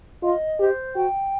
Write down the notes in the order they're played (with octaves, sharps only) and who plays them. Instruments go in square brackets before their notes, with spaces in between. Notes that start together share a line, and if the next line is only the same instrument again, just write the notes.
[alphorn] F4 [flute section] D#5
[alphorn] G4 [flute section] C5
[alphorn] F#4 [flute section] G5